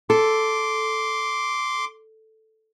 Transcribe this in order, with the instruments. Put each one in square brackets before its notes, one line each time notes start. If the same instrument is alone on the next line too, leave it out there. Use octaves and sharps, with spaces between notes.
[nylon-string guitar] A4 [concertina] C6 D6